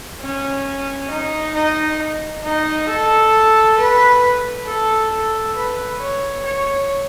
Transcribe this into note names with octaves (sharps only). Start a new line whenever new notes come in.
C#4
D#4
D#4
D#4
A4
B4
A4
A4
B4
C#5
C#5